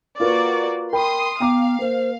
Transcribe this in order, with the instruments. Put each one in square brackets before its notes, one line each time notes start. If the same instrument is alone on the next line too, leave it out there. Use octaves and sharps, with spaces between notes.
[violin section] A#3 F#4 D5 [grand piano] F4 A#4 B4
[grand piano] A#4 G5 B5 [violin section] C6 D#6
[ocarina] B3 [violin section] F5 [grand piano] G5 A#5 D6
[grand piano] A#3 [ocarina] C5